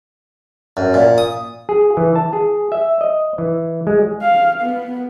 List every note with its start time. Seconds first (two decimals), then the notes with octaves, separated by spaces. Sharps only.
0.77 F#2
0.94 A#2
1.18 D#6
1.69 G#4
1.97 E3
2.16 A5
2.33 G#4
2.72 E5
3.01 D#5
3.38 E3
3.87 G#3
4.22 F5
4.61 B3